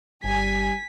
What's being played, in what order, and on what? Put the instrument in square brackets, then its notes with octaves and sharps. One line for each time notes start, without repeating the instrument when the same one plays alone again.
[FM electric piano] G1 [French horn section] G3 [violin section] G#5 [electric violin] B6